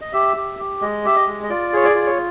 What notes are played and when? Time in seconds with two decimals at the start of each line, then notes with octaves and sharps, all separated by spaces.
0.01 D#5
0.13 G4 E5
0.37 G4
0.59 G4
0.81 G#3 D#5
1.05 G4 E5
1.16 D#5
1.27 G#3
1.44 D#5
1.50 F4 D5
1.73 G#4 C#5
1.84 D5
1.95 F4
2.06 C#5